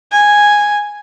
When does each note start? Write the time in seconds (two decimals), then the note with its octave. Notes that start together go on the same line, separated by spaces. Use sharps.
0.12 G#5